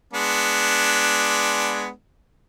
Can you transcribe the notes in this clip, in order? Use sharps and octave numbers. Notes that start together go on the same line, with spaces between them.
G#3 B3 D4